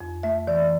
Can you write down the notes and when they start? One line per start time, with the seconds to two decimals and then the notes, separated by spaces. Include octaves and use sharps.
0.01 F2
0.23 A3 E5
0.47 E3 D5